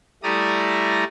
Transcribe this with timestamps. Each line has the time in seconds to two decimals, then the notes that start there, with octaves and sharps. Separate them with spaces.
0.23 G3 A3 E4 D5 A#5 D#6